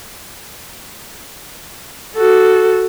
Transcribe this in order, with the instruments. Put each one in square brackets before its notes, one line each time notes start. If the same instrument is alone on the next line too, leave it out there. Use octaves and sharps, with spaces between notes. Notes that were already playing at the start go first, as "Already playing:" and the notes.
[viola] F#4 A4